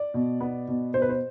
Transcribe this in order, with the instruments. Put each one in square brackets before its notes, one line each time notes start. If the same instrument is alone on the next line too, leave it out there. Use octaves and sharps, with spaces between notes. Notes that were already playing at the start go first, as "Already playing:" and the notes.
Already playing: [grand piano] D5
B2
B3
B2
B2 C5
B4
C5